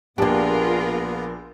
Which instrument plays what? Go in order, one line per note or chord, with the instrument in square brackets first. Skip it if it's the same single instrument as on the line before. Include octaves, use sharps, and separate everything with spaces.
[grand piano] A#1 D4 [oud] A#3 G4 [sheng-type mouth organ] B3 [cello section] F4 G#4 A#4